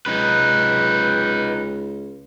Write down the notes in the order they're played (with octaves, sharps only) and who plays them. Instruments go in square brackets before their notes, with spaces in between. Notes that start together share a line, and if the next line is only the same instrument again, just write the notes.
[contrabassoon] C#2 [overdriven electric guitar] D#4 B4